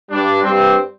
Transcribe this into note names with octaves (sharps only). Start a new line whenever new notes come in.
G2 G3 D4
G2 G3 C4